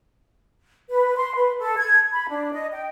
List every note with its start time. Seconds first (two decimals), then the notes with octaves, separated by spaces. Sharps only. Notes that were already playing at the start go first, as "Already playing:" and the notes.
0.89 B4
1.16 C6
1.34 B4
1.59 A4
1.77 G#6
2.11 B5
2.29 D4
2.52 D#5
2.72 G5